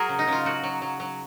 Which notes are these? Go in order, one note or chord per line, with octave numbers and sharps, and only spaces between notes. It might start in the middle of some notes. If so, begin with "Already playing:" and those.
Already playing: F#3 F#4 G#4 A#4
C#3
D#4
C#3 F4
F#3 F#4
F#3
F#3
F#3